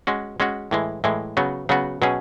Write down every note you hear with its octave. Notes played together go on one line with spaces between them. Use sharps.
G#3 C#4 F#4
G#3 C#4 F#4
A2 E3 G#3
A2 E3 G#3
C#3 F#3 B3 F#4
C#3 F#3 B3 F#4
B2 F#3 C#4 G#4